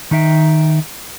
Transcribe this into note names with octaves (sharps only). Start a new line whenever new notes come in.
D#3 D#4 E5 G5